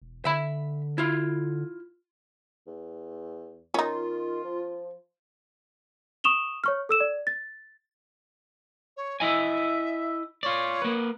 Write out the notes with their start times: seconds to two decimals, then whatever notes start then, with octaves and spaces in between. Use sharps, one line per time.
0.02 E1
0.25 D3 E5 B5
0.98 E4 F4
2.67 E2
3.74 D#3 C#4 D#4 F4
4.44 F3
6.24 C#6 D#6 E7 F7 G7
6.64 C#5 C#6 F6
6.89 A4 E6 E7
7.00 D5
7.27 A6
8.97 C#5
9.20 E4 D#5 E5 G#5
10.43 F4 C#5 D5
10.82 A#3 B4